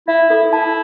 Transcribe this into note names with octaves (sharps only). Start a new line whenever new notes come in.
E4 E5
E4 A4
E4 A5